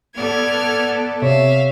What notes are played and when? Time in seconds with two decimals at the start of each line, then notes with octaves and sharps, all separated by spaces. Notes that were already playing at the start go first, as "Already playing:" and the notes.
0.16 B3 A4 D5 F6 G#6
1.22 C3 C#5 E5 F5